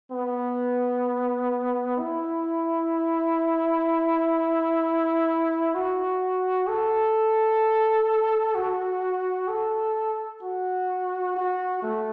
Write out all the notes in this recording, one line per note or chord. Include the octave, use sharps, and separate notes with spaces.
B3
E4
F#4
A4
F#4
A4
F#4
F#4
A3